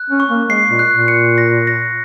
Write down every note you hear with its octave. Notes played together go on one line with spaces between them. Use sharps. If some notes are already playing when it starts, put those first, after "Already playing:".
Already playing: F#6
C#4
C#6
A#3
G#3 C7
A#2
F#6
A#2
C#7
A#6
A#6